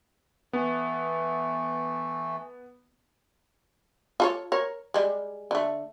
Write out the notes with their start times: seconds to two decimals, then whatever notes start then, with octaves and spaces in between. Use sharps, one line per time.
0.53 E3 A3 B3
4.20 F4 A4 C#5
4.52 A#4 C#5
4.94 G3 G#3
5.51 D3 A3